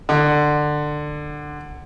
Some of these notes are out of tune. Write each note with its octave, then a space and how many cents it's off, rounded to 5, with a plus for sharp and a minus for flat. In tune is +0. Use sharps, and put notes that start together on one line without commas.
D3 +20